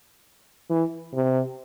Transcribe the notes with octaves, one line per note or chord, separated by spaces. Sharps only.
E3
C3